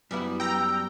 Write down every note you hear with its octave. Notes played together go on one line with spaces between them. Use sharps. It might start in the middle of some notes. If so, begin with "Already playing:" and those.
F#2 G3 B3 E4
G5 A#5 E6